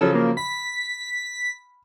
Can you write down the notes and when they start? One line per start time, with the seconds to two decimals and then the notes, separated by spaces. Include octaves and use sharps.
0.01 C#3 F3 F#3 A4
0.15 A#3
0.37 B5 B6